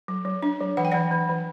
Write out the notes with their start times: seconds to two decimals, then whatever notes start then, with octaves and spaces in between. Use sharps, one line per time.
0.08 F#3
0.25 F#3
0.43 D4
0.60 F#3
0.77 E3 F#5
0.85 G5
0.91 E3 D5 F#5
1.11 E3
1.29 E3